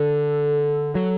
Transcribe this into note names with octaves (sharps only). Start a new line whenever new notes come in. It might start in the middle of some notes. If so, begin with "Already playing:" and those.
Already playing: D3 A4
F#3 A4